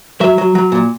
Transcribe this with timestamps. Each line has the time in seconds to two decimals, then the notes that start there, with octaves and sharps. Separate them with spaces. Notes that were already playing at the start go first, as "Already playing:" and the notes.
0.21 F#3 E5
0.38 F#3
0.55 F#3
0.72 A#2